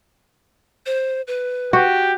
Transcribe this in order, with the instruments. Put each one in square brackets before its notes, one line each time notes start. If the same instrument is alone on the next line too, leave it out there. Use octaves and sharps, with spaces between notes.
[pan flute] C5
B4
[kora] F#4 [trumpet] G4